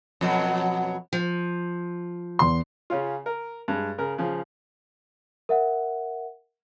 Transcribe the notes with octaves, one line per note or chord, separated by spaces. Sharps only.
F2 B2 F#3
F3
E2 C6
C#3 C#4 F4
A#4
G2 G#3
C#3 A#4
C#3 F3
A#4 E5 F#5